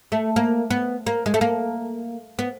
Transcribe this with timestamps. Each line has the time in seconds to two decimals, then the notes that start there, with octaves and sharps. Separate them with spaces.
0.12 A3
0.36 A#3
0.71 B3
1.07 A#3
1.26 G#3
1.34 A3
1.41 A#3
2.39 B3